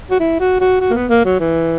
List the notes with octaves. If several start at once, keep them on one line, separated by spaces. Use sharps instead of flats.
F#4
E4
F#4
F#4
F#4
A#3
B3
A#3
F#3
E3